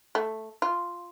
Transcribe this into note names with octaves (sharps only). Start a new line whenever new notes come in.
A3
F4